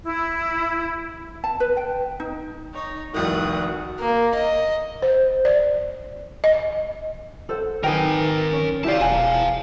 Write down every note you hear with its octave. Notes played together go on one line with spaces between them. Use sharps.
E4
A5
B4
G5
D#4
D#4 C#5
F1 C2 D#3 F#4 D#6 F#6
A#3
D#5
C5
D5
D#5
A4 C5 F#5
D#3 D#4 A#4 B4 G5 G#5
C#4
E4 G4 D5 F5 A5
E1 F#5 G#5 A#5